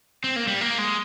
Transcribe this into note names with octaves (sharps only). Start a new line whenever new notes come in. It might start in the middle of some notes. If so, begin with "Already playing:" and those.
C4
A#3
G3
A#3
G#3